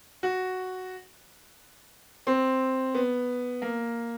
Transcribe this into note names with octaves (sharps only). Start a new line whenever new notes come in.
F#4
C4
B3
A#3